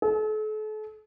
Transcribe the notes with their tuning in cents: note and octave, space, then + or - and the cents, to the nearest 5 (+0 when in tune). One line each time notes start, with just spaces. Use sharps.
A4 -40